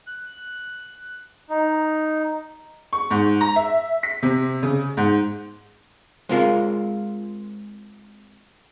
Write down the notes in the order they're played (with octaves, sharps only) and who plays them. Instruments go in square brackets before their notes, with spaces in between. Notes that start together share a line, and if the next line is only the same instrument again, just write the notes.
[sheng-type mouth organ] F#6
D#4
[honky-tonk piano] C#6
G#2
A#5
E5
B6
C3
C#3
G#2
[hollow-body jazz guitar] G#3 C4 F4 A#4 F5